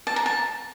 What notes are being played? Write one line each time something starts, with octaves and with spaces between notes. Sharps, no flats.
A5
A#5
A5